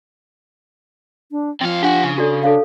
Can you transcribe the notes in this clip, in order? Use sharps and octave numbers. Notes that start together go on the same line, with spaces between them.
D4
C3 F3 F5
D4 G4 F#5
C#3
F#4 A4 D5
D4 A4 C#5 F5